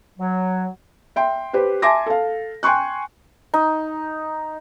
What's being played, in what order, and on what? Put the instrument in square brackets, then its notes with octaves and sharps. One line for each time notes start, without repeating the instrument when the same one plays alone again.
[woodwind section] F#3
[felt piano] E5 G5 C6
G4 B4 C5
E5 G#5 A5 C6 D6 A#6
A4 F5
G5 G#5 C6 C#6 F#6
[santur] D#4